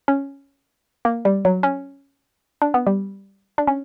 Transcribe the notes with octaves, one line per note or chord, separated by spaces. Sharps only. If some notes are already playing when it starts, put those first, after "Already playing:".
C#4
A#3
G3
F#3
C#4
D4
B3
G3
D4
C#4